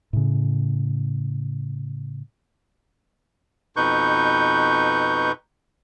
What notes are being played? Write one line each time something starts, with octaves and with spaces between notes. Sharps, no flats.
A2 C#3
F2 B2 D#4 B4 C#6 G6